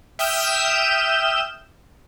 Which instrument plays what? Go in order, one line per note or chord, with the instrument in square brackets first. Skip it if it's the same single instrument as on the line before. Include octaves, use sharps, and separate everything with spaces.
[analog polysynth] E5 G5 D#6 F6 G6 E7